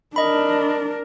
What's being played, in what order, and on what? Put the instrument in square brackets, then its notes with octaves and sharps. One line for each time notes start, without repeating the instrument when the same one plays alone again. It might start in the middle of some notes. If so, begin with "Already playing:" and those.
[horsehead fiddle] D4 A#4 [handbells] D#5 B5